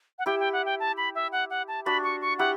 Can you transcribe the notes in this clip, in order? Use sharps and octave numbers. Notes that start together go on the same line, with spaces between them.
F#5
E4 G4 G5
G5
F#5
G5
A5
B5
E5
F#5
F#5
A5
D4 F#4 B5
C#6
C#6
E4 G4 F#5